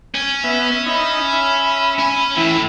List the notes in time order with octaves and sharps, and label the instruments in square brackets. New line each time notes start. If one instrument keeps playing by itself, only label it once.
[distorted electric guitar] C#4
[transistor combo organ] B3 E5
[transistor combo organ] D#4 E5 [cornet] B5
[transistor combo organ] E5
[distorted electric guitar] C#4 G#5
[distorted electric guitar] A2 [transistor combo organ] E3 E4